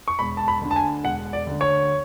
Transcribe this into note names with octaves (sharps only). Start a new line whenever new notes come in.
C#6
E1 B5
A5
B5
D2 D3
A5
G#5
E1 F#5
D5
D2 D3
C#5